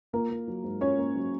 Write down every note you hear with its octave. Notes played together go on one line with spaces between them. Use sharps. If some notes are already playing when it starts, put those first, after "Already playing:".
A#3 F4 A#4
A#3
F#3
G#2
C#4 F4 C#5
A#3
F#3